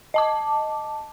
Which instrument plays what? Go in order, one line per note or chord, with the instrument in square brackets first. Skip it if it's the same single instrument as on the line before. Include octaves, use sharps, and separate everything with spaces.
[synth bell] D#5 A5 D6